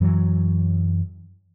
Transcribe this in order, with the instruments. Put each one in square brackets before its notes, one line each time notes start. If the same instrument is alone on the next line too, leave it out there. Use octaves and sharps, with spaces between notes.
[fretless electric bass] F#2 E3 F#3